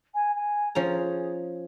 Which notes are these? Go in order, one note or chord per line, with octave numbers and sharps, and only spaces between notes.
G#5
G#5
F3 C#4 G#4 A#5